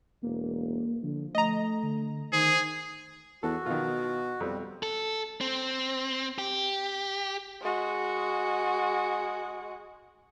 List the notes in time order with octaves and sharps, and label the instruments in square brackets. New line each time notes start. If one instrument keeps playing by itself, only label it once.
[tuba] E1 [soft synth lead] A#3
[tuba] D3 [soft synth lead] F3
[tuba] A3 [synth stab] D#5 A#5
[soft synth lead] D3
[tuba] D#3 [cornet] G#4 [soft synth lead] C5
[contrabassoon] E2 [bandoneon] F#4 [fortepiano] A4
[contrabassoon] B2 [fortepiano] D#3 F4
[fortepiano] F2 [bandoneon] G3
[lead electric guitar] A4
C4
G4
[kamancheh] G#3 F#4